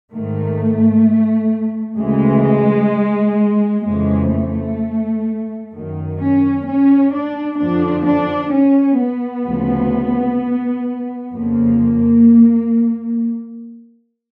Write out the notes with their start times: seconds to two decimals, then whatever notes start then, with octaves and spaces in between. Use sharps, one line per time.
0.12 G#2 D#3 A3
1.98 D2 C#3 E3 G#3
3.85 F2 C#3 E3 G#3
4.32 A3
5.72 F#2 D#3
6.19 C#4
6.66 C#4
7.13 D4
7.59 F2 D3 F3 D4
8.06 D4
8.53 C#4
8.99 B3
9.45 D2 C#3 F3
11.33 F2 C#3 F3 A#3